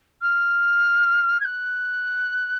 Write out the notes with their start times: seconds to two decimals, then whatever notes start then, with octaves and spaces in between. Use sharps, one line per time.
0.22 F6
1.40 G#6
1.45 F#6